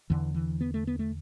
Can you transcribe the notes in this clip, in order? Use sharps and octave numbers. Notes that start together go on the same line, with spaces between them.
E2 D3 E3
E3
B3
A3
B3
A3